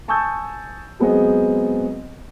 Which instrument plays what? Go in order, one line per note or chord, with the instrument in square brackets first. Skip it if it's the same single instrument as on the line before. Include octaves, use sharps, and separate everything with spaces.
[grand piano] G#5 A5 C#6 D#6 E6 G6
F#3 G#3 B3 C4 G#4 D#5